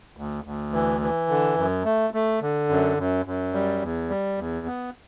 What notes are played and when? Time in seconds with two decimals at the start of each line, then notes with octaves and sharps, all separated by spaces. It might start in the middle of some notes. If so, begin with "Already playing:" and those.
0.17 D2
0.44 D2
0.73 E3
1.01 E3
1.29 D3
1.57 F#2
1.85 A3
2.14 A3
2.41 D3
2.69 F#2
2.97 F#2
3.26 F#2
3.53 G3
3.82 E2
4.10 G3
4.38 E2
4.66 B3